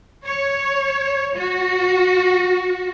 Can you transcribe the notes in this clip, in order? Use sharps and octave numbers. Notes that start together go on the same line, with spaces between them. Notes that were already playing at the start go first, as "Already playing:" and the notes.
C#5
F#4